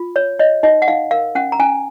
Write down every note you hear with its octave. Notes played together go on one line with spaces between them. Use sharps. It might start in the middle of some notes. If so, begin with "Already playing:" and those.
Already playing: F4
C#5
C#5 D#5
D#4 D#5
F#5
D#4 F5
A#4 F5
C#4 F#5
A#5
C#4 G#5